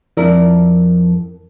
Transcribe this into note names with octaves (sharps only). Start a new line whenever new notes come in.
F2 E4 A#4 D5